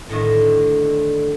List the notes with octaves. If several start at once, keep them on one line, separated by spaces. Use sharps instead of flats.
A2 D3 D#3